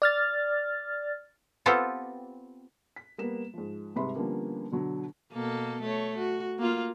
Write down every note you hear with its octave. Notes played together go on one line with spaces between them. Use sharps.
D5 F6 A6
B3 C4 F4 G4 A4
B6
G3 A#3 B3 E7
G#2 F3
C2 G#2 C3 B4 B5 C6
D3 F3 G3 A#3 B3 C#4
B2 D3 F#3
B2 A#3 A4
A3 C#5
F#4
A#3 F4